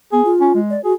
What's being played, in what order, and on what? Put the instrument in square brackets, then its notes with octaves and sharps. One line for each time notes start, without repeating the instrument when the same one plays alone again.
[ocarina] B3 [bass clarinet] G#4
[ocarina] F4
[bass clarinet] C#4
G#3
[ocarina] D5
[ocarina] F#4 [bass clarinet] G#4